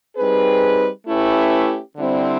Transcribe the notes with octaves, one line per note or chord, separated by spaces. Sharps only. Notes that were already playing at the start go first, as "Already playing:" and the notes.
G3 C4 D#4 G#4 B4
A3 C#4 E4 G4 B4
D3 G3 C4 E4